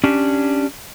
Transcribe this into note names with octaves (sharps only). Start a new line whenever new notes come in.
C#4 D4 G4